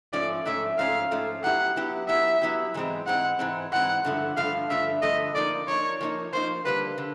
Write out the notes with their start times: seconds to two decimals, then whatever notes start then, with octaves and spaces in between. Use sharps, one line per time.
0.13 G#2 F3 A3 C#4 D5
0.46 G#2 F3 A3 C#4 E5
0.79 G#2 F3 A3 C#4 F5
1.11 G#2 F3 A3 C#4
1.44 F#3 B3 E4 G4 F#5
1.76 F#3 B3 E4 G4
2.09 F#3 B3 E4 G4 E5
2.42 F#3 B3 E4 G4
2.74 G#2 E3 G#3 C4
3.07 G#2 E3 G#3 C4 F#5
3.39 G#2 E3 G#3 C4
3.72 G#2 E3 G#3 C4 F#5
4.04 G2 D3 F3 A3
4.37 G2 D3 F3 A3 F5
4.70 G2 D3 F3 A3 E5
5.02 G2 D3 F3 A3 D#5
5.35 F3 A#3 D#4 D5
5.68 F3 A#3 D#4 C#5
6.01 F3 A#3 D#4
6.33 F3 A#3 D#4 C5
6.65 D3 G3 A#3 B4
6.98 D3